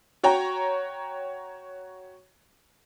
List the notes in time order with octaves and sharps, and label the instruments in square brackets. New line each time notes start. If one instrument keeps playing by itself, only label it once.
[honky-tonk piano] F#4 C#5 G5 A#5